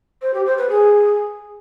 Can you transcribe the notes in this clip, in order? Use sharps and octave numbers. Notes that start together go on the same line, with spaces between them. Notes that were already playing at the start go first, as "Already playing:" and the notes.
C5
G4
C5
B4
G#4